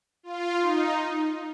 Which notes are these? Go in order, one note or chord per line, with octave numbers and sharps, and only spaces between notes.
F4
D#4